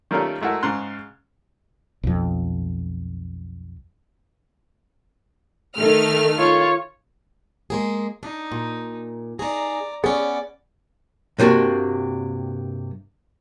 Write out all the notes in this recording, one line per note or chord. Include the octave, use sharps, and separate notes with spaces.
D#3 G3 A3 A#3 C#4 F4
G#3 A3 E4 F#4 A#4
G#2 C#3 A#5 C6 F#6
B1 F2
D#3 A3 F6
F4 C#5
G#3 A#3 G#4
D4 D#4
A#2
D#4 G#4 D5 A#5
B3 C#4 G#4 D5
G2 C3 A#3 D4 F#4